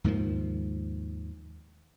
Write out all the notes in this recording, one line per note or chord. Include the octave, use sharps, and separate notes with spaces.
D#2 G#2 D#3 F3